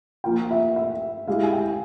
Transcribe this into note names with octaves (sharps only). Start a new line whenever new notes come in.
F3 A#3 F4 G5
E5
E5
G#3 E4 G4 F5
G#5
G5